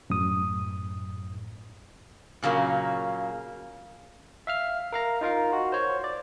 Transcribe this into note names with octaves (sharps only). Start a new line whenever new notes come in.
F#2 A2 D#6
A#2 C#3 F#3 A#3
E5 F5 F6
A#4 F5 A#5
D#4 F4 A#4 F5
F#4
C5 C#5
D5